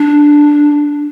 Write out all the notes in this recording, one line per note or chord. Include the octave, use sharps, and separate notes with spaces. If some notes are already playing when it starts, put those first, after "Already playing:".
Already playing: D4